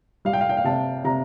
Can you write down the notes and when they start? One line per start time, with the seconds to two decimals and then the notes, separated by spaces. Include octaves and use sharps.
0.25 G3 F5
0.33 G5
0.41 F5
0.49 G5
0.57 F5
0.64 C3 A5
1.04 C3 A#5